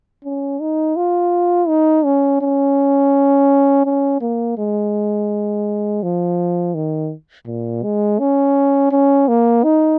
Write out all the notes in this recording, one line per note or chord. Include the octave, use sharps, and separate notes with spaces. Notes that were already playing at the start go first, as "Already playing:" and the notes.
C#4
D#4
F4
D#4
C#4
C#4
C#4
A#3
G#3
F3
D#3
A#2
G#3
C#4
C#4
A#3
D#4